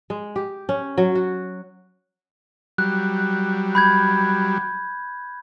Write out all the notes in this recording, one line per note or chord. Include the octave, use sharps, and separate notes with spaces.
G#3
G4
C#4
F#3
F#4
F#3 G3 F#6
B5 G6 G#6